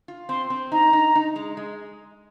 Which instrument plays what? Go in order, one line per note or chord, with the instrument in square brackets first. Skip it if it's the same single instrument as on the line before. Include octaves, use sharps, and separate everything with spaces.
[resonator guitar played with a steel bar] F4
[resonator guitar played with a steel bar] C4 [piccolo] C6
[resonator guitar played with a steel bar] C4
[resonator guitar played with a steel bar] D#4 [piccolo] A#5
[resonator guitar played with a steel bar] D#4
D#4
G#3
G#3